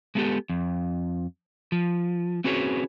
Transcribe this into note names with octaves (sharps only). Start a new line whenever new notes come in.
G#3 A3 B3 D#4 G4 A4
F2
F3
C4 C#4 F#4 G#4 B4 C#5